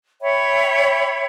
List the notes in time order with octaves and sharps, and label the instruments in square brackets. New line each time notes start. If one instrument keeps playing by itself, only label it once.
[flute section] C#5 E5 G5 B5